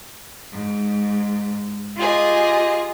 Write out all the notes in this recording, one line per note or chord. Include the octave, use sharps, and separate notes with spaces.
G#2
F4 G4 G#4 D#5